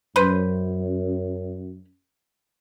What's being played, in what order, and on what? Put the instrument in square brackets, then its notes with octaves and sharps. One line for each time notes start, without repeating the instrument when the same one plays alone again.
[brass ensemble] F#2 [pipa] B4 C5